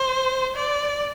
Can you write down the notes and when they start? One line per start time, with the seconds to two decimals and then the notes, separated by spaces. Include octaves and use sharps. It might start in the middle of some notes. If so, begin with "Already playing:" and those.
Already playing: C5
0.56 D5